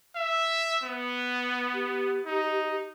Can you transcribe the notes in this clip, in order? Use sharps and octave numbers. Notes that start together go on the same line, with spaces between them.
E5
B3
G4
D#4